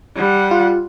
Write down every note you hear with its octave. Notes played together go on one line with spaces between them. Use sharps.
G3 F#5
F4